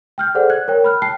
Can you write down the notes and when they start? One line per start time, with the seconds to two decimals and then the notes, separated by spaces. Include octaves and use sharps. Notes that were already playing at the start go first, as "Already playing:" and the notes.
0.18 G5 F6 G6
0.35 G#4 A4 C5 D5 F#5
0.50 F#6 G#6
0.68 A#4 C#5 G5
0.84 B5 F6 F#6
1.02 G5 A5 C7